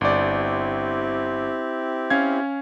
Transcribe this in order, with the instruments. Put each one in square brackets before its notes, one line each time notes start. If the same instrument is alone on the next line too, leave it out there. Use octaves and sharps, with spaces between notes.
[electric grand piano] G1 D5 [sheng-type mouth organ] C4 E4 G4
[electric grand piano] C#4 F5 G#6